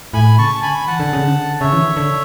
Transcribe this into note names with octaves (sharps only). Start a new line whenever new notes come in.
A2 G#5 B5
C#3 A5 C#6
D3 G#5 B5
E3 F#5 A5
D3
C#3
D3
C#3 C#5 E5
E3
D3
D3